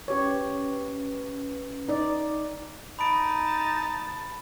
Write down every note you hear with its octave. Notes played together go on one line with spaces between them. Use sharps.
C#4 G4 B4 C#5
D#4 D5
D#4 A5 B5 D7